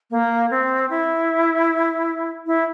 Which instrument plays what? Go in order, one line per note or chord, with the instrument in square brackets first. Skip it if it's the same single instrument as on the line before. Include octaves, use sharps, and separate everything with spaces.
[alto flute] A#3
C4
E4
E4